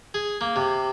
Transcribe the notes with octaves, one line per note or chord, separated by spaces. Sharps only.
G#4
A#3
C3